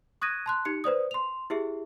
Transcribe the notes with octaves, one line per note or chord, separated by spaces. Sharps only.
C#6 D#6 F#6 G#6 A#6 D#7
A5 C6 F#6
D#4 G4 C#7
B4 C5 D5 D#6
C6 F7
E4 G4 G#4 E5